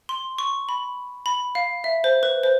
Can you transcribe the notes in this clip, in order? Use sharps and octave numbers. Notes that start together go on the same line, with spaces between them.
C6
C#6
B5
B5
F5
E5
C5
B4
C5